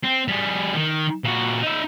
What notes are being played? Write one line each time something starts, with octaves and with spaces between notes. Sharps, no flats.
C4
G3 G#4
D#3
A#2 F#4
D#4 E5